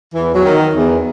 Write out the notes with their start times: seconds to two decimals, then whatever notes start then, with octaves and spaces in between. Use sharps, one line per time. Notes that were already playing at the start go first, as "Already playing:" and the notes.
0.15 E2 E3
0.35 F#3
0.45 D#3
0.74 E2